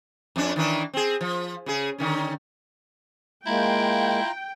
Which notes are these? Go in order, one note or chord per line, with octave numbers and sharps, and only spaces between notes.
F2 C#4 D4
D#3 E3 D4
C4 G#4
F3
C#3 G#4
D3 D#3 C#4
G#3 A#3 E4 F4 G5 A#5